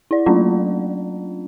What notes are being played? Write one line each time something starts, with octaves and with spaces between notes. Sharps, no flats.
E4 D5
F#3 A3 A#3 C#4 D4 F4